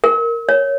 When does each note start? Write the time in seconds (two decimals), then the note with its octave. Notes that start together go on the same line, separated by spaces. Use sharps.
0.04 A#4
0.49 C#5